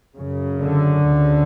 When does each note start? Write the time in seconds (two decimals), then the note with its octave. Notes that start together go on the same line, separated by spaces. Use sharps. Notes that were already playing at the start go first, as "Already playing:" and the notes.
0.17 F#2 C#3
0.62 D3
1.07 D2 C#3